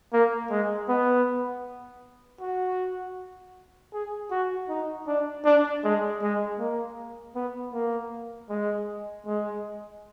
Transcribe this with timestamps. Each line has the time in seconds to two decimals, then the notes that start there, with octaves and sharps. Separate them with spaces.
0.13 A#3
0.50 G#3
0.89 B3
2.41 F#4
3.94 G#4
4.31 F#4
4.69 D#4
5.07 D4
5.45 D4
5.84 G#3
6.22 G#3
6.59 A#3
7.35 B3
7.73 A#3
8.49 G#3
9.26 G#3